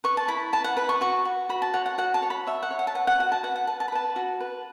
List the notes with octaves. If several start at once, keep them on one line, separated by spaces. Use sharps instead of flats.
B4 C#6
A5
E4 B5
B4 A5
F#5
B4 B5
C#6
F#4 C#6
F#4
F#4 B5
A5
C#5 F#5
F#5
F#4 F#5
A5
C#5
B5
C#5 E5
F#5
C#5
F#5
A5
B4 F#5
F#5
F#4 F#5
A5
B4 F#5
F#5
B4 A5
A5
B5
B4 A5
F#4
B4